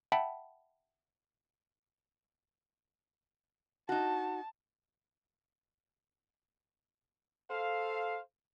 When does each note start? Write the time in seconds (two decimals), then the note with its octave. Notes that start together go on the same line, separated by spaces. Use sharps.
0.12 E5 F#5 G5 A5 B5
3.89 D#4 F#4 A5
7.50 A4 C5 F5